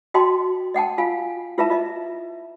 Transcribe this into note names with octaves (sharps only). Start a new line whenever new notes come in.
F#4 D#5 G5 A5 C6
D#5 F#5 G5 A5
F4 F5 G#5
E4 F4 B4 E5 A5 A#5
F4 D#5 E5